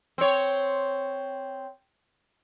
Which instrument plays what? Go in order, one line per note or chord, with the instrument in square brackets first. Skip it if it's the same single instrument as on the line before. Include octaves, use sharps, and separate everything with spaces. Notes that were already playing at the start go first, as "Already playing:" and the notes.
[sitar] C4 C#5